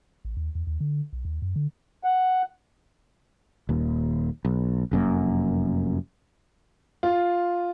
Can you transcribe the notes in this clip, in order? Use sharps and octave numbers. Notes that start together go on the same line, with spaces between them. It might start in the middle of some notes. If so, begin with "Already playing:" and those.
A1
D#2
E2
D#2
D3
B1
D#2
F#2
D3
F#5
D#1 D#2
B1
F1 F#2 C3 A#3
F4